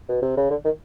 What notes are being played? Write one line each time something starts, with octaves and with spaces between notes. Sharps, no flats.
B2
C3
C#3
D3
D#3